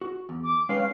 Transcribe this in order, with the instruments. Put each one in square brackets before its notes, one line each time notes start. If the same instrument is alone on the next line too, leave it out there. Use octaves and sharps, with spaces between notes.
[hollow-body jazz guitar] F#4
E2
[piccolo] D6
[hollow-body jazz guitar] G#3 B4 G5 [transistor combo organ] C#4 F5 [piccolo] C7